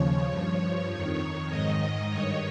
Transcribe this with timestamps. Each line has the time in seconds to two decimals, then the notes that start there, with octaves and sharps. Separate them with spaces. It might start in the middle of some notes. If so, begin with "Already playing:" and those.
Already playing: D#2 C#3 F3 C#5
0.28 G2 F3
0.90 F2 D#3 C#5
1.49 G#2 D#3 D#5
2.11 G2 D#3 C#5